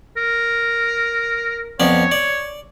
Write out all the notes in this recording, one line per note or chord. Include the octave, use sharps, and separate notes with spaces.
A#4
F2 B3 C#5 D5
D5